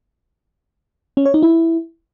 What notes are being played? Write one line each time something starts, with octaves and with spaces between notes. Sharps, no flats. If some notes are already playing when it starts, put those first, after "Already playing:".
C#4
C#5
D#4
E4